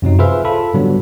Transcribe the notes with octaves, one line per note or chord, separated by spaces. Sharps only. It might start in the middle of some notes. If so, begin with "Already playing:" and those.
F#2 C3 F#3 D#4
F4 G#4 B4 C5 E5 F5
F4 A4 B5
G#2 D3 F#3 G3 B3